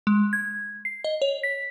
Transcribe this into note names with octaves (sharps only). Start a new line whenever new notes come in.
G#3
G#6
C7
D#5
C#5
B6